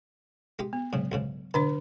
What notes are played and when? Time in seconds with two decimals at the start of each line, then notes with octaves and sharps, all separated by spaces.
0.59 G#3 D#4 G4
0.73 B3
0.93 G#2 C#3 F#3
1.12 B1 G#2 C#3
1.54 D3 D4 C5 D5 D#5 A5